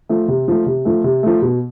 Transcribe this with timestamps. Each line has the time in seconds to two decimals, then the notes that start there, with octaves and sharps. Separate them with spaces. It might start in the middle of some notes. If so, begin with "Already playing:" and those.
0.09 F3 A3
0.28 C3
0.48 F3 A3
0.66 C3
0.85 F3 A3
1.04 C3
1.23 F3 A3
1.42 B2